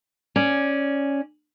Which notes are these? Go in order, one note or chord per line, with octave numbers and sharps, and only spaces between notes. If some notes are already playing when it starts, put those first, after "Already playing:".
C#4 D5